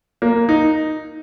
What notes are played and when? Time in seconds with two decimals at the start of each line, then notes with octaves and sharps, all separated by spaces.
0.22 A#3
0.49 D#4